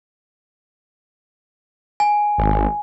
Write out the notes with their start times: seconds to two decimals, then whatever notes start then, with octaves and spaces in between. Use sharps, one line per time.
2.00 G#5
2.38 G#1